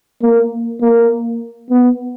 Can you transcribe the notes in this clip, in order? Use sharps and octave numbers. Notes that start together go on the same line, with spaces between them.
A#3
A#3
B3